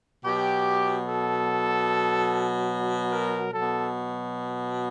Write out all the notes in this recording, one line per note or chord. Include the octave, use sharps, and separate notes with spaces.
B2 F#3 G4
A4
A#4
B2 F#3 A4